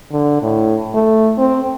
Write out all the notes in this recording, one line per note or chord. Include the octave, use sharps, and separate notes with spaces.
D3
A2
A3
C4